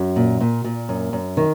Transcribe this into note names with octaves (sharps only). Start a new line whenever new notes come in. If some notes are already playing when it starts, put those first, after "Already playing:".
Already playing: F#2
A#2
A#2
A#2
F#2
F#2
D#3